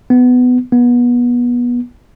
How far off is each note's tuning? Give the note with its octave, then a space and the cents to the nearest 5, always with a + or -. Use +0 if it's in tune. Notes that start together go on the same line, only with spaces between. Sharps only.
B3 +15
B3 -25